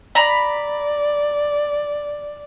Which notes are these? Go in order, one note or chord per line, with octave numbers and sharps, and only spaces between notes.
D5 A#5 B5